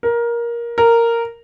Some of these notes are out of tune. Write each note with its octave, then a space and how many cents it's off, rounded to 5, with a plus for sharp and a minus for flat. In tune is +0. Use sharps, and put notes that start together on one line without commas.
A#4 +15
A#4 -10